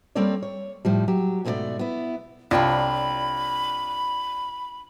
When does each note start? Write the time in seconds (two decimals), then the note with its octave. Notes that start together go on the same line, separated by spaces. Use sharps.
0.15 G3 A#3 C4 A4 C#5 D5
0.43 C#5
0.85 A2 F3 G3
1.08 F#3 G4
1.45 G#2 B2 A3 E4 F#4 D5
1.79 B3 E4
2.51 C2 D4 F4 C#5 G5 B5